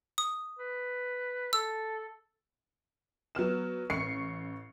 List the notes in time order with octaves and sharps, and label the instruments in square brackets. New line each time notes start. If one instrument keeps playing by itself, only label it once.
[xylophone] D#6
[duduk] B4
[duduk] A4 [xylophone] E6
[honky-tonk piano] F#3 B3 F6 E7
A1 C#6 C7 C#7